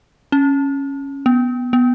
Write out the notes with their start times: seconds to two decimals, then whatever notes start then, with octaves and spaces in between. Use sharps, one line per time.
0.32 C#4
1.26 B3
1.73 B3